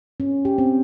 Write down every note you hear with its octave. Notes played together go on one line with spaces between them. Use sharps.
C#4
G4
C4